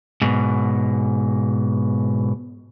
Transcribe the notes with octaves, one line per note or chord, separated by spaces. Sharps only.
G#2 B2